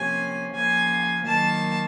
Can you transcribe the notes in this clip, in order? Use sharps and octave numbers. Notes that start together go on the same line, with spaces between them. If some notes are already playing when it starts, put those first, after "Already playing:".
Already playing: C3 F3 A#3 C#4 G#5
C#3 F3 A#3 G#5
D#3 F#3 A#3 A5